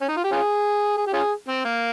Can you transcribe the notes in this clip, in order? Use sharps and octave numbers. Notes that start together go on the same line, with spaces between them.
C#4
D#4
F4
G4
C#4 F4 G#4
G#4
G4
C#4 F4 G#4
C4
A#3